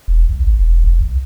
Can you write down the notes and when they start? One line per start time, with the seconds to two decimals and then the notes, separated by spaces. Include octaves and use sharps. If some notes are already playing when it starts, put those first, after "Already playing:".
0.08 E1
0.29 C2
0.44 G#1
0.59 E1
0.84 F1
1.01 C2